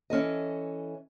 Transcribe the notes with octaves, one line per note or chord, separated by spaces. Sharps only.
E3 C#4 A4 D#5